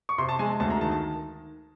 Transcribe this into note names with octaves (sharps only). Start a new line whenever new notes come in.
C#6
C3 C6
A5
G#3 G#5
A5
D2 A5
A#5
D#3 A5
A5